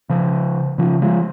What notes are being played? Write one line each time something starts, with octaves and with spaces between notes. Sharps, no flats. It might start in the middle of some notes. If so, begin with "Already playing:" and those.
C#3 F3
C#3 F3
F3 G#3